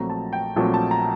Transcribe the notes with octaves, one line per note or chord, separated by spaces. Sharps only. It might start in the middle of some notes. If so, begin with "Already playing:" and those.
Already playing: A#1 A#2 F#3 A3 C4 A#5
A5
G5
A#1 A#2 F#3 A3 C4 A5
A5
A#5